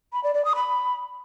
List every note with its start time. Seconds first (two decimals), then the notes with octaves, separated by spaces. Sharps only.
0.13 B5
0.24 D5
0.34 D5
0.45 D#6
0.55 B5